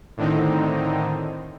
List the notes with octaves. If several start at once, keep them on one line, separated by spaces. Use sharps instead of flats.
A2 D3 D#3 C4 D#4